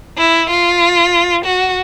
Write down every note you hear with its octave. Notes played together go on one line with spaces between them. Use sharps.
E4
F4
F#4